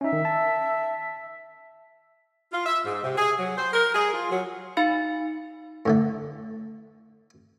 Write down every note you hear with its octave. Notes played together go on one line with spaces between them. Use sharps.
C#4 D#4 E5
D#3
A5
F4
E5
G#2
C3
G#4
F#3
C5
A#4
G#4
F4
F#3
D#4 F5 B5 A6 C#7
A2 D3 A3